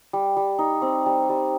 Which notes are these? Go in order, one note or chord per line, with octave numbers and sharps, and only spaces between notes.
G3
G3
D#4
C4
G3
G3